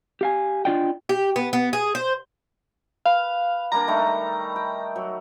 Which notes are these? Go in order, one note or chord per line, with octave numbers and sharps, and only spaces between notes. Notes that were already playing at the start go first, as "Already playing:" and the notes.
G4 F5 G#5
D4 F4 D5 D#5 G5
G4
B3
B3
G#4
C5
B4 F5
G3 A#3 D4 A#5
D#3 G3 A3
G5
F#3